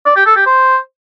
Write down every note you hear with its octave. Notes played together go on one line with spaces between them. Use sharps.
D5
G4
A4
G4
C5